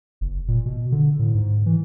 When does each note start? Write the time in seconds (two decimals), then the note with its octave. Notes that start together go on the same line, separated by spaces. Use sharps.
0.21 F#1
0.48 A#2
0.66 B2
0.92 D3
1.19 A2
1.34 G#2
1.66 E3